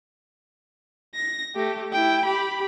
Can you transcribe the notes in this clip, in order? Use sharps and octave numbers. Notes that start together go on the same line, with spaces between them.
A#6
A3 G4
E4 G5
G4 B5